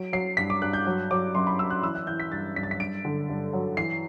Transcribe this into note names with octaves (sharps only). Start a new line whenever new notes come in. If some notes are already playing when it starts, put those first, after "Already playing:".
Already playing: F#3 D7
F#3 C7
G2 B6
D6
G2 F#6
G6
F#3
F#3 D6
F#2 C6
B5
F#2 E6
F#6
E3 E6
F#6
E3 G6
B6
G2 A6
G2 B6
A6
B6
G2 D7
D3
G2
F#3
E3 C7